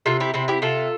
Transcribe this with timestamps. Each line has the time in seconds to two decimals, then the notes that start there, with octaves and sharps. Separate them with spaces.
0.06 C3 F4 A4
0.20 E4 G4
0.34 C3 C4 E4
0.48 E4 G4
0.62 C3 F4 A4